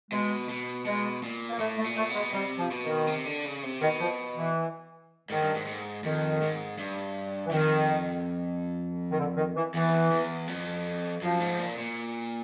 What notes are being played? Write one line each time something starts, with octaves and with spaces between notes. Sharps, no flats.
B2 G#3
B2
B2 G#3
A#2
A#3
A2 A3
A3
A#2
A3
B2
G#3
C3 G3
F3
B2
D#3
C3
D3
C#3
C3
B2 D#3
F3
E3
G#2 D#3
G2
G#2
G#2
F2 D#3
G#2
G2
E3
F2 D#3
D#3
D3
D#3
E3
E2 E3
E2
F2
F#2 F3
G#2
A#2
A#2